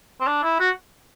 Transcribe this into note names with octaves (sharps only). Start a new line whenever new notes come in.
C4
D4
E4
F#4